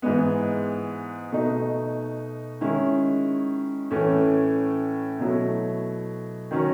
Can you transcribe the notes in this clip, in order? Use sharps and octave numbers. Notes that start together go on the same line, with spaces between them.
G#2 E3 G#3 B3
B2 A3 D#4
D#3 G#3 C#4 E4
A2 E3 A3 C#4
B2 F#3 A3 E4
D#3 F#3 C#4